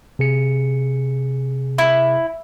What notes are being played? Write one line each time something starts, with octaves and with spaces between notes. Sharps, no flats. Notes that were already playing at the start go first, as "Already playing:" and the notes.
C3 G#4 C#7
E4